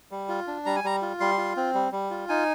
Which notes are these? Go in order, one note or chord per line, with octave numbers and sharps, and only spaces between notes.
G3
F4
D4
G3 A#5
G#5
G3 A#5
F4
G3 C6
F4
C4
G3
G3
F4
D#4 G#5